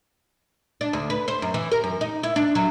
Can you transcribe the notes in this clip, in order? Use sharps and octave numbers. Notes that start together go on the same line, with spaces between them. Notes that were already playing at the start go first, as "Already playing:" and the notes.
D4
D2
B4
C5
F#2
E3
A#4
F#2
D#4
E4
D4
F#3